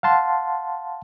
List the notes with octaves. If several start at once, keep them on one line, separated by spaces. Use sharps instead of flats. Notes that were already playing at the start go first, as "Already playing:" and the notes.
F5 F#5 A5 C6